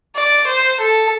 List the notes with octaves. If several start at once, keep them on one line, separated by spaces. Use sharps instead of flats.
D5
C5
A4